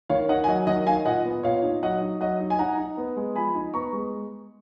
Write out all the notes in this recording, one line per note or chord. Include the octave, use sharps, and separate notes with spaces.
D#3 C#5 F5
D#4 D#5 F#5
G#5
F#3 D#5 F#5
D#3 D#5 F#5
D#4 F5 G#5
A#2 D#5 F#5
B3
A#2 C#5 F5
D#4
F#3 D#5 F#5
D#4
F#3 D#5 F#5
D#4
G#5
D#4 F#5 A#5
D#4
B3
G#3
F3 G#5 B5
D#4
B3 A#5 C#6
G#3